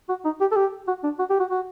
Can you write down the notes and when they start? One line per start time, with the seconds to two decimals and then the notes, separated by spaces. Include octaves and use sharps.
0.09 F#4
0.25 D#4
0.41 G4
0.52 A4
0.56 G4
0.88 F#4
1.04 D4
1.19 F#4
1.30 G4
1.40 F#4
1.50 F#4